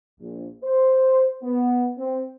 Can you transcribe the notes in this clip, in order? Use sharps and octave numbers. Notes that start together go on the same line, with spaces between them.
A#1
C5
B3
C4